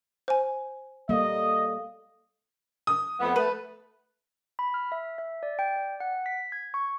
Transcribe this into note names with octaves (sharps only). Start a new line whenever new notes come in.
C5 G#5
G3 A#3 A4 D#5 F5 D#6
D#6
F2 A3 B3
A3 B4
B5
F6
E5
E5
D5
G5
D5
F#5
B6
G#6
C#6